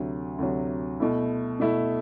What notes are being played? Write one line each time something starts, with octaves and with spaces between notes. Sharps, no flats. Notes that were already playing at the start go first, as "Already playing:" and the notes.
Already playing: D2 C3 F#3
D2 C3 F#3
B2 A3 E4
B2 A3 E4